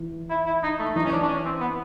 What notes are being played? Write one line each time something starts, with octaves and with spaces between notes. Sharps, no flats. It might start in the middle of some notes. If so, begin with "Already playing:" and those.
Already playing: E3
E4
E4
D#4
A3
E3 D#4
C#4
D4
D4
C#4
C4
B3